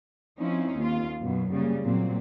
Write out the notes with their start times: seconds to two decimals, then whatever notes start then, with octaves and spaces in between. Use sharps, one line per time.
0.38 F3 C4 C#4 D#4 E4
0.76 D#2 F4
1.20 F#2 B2 F#3
1.51 C#3 G3 A#3
1.82 A#2 F#3 A#3 C4